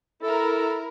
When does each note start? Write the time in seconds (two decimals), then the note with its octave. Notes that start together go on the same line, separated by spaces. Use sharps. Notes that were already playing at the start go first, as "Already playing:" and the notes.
0.22 E4 A4 A#4